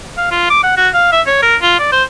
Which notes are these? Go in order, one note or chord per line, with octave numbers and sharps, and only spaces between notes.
F5
F4
D6
F#5
F#4
F5
E5
C#5
A#4
F4
D5
C5